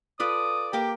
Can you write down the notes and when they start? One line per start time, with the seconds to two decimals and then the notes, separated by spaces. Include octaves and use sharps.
0.20 F4 A4 B4 D5 D#6
0.73 A#3 G4 A#4 D6